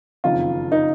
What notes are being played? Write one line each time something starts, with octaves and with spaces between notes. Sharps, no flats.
F#1 F2 D#3 F4
D#4